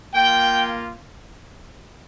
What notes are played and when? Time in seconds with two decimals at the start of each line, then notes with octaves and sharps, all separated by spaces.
0.14 A#3 F4 G5